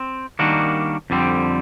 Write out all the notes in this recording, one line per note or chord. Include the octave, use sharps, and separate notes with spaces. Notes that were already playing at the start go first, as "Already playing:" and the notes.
Already playing: C4
D#3 G3 A#3 D4 F#4
F2 D3 G3 C4